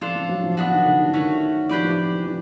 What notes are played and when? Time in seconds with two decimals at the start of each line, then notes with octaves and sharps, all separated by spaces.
0.01 F3 D4 F4 A4
0.15 F3
0.29 F#3
0.44 F3
0.57 E3 B3 D4 F#4
0.71 D#3
0.86 D3
1.00 D3
1.10 E3
1.14 D#3 A3 C#4 F#4
1.69 F3 D4 G4 B4 D5
1.84 F3
2.13 E3
2.26 F3